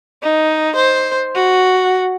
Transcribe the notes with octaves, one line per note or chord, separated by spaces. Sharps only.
D#4
C5
F#4